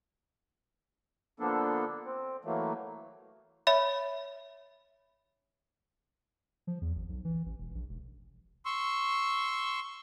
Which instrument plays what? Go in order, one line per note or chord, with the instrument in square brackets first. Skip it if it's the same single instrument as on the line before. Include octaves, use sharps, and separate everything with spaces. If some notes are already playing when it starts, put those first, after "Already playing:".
[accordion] D3 F3 A#3 B3 D4 A4
C4
E3 F#3 A3 A#3
[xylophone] C#5 E5 B5
[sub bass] F3
E2
G#1
B1
E3
A1
E1
A#1
E1
[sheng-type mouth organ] C6 C#6 E6